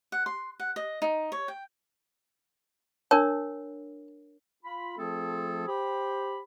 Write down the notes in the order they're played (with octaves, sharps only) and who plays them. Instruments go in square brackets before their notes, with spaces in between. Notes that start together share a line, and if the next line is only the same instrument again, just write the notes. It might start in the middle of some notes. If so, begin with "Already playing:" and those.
[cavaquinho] F#5
C6
F#5
D#5
D#4
C#5
G5
[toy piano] D4 A#4 C#5 [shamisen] A5
[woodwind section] F4 B5
F3 A3 C4 F4 G#4 A4
G4 C5 B5